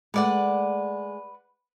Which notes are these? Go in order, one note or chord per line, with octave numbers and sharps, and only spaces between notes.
G#3 A3 B4 D5 F#5